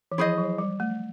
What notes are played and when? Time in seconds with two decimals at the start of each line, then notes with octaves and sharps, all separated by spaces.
0.12 E3
0.18 F3 E4 G#4 C5 D#5
0.38 F#3
0.58 G3
0.80 A3